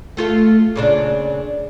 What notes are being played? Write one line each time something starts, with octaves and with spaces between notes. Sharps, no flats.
A3 F4 A4
A#2 C#3 D4